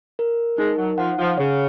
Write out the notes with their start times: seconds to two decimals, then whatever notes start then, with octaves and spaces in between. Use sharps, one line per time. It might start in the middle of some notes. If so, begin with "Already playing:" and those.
0.19 A#4
0.58 G#3 D#4
0.78 F#3
0.98 F3 F#5
1.18 F3
1.38 C#3 C#5